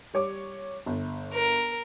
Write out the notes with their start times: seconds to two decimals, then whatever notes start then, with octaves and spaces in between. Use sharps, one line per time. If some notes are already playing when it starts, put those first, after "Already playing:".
0.14 G3 C#5 D6
0.86 G1
1.33 A#4